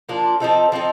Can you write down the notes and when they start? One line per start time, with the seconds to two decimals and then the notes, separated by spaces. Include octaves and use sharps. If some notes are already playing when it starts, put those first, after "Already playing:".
0.09 F3 A#3 D4 F4
0.40 F3 C4 D#4 A4
0.72 F3 C4 D#4 A4